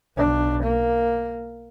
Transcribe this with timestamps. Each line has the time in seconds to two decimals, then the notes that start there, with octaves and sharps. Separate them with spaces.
0.17 B1 D4
0.63 A#3